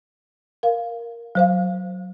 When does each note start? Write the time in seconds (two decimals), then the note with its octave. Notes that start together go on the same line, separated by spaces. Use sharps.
0.63 A#4 F5
1.35 F#3 C5 F5